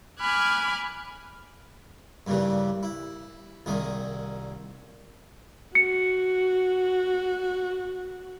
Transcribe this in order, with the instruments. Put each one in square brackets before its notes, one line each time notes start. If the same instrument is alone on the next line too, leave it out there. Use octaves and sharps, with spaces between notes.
[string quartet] G#5 B5 D6 F6 F#6 G#6
[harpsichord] G2 A#2 C#3 E3 G3
E4
C2 A#2 D#3 G#4
[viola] F#4 [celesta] C#7